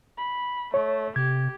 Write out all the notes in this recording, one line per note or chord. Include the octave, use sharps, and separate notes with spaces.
B5
A3 C#5
C3 G4 G#6